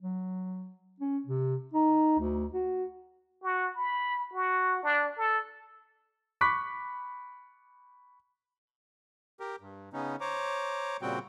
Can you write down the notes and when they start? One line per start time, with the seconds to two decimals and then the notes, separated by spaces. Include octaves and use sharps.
0.02 F#3
1.00 C#4
1.26 C3
1.74 D#4
2.19 D2
2.53 F#4
3.43 F#4
3.76 B5
4.33 F#4
4.84 D4
5.17 A4
6.41 B5 C#6 D6 F#6 B6
9.40 G4 A#4
9.61 G2
9.93 C#3 B3 C#4 D#4
10.21 C5 C#5 A#5 D6
11.02 A#2 C#3 G3 C4 F#4 G5